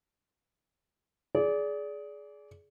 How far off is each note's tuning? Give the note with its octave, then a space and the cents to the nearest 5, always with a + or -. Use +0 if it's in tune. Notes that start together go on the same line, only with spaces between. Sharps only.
G#4 +15 D5 -20